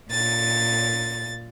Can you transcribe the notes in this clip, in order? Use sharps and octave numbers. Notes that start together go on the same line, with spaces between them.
A#2 A6